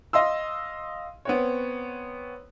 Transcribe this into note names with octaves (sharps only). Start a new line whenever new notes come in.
D#5 F5 C6 E6
B3 C4 C#5